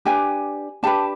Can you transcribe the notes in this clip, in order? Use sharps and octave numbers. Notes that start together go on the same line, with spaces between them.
D4 G4 B4 G#5
D4 G4 B4 A5